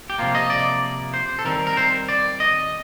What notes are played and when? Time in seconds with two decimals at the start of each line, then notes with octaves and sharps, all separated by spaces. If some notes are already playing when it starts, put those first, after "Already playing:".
0.10 G4
0.18 C3 F3 A#3 F4
0.35 D#5
0.50 D5
1.14 C5
1.39 A4
1.45 D#3 G3 C4 A#4
1.67 A#4
1.77 C5
2.09 D5
2.40 D#5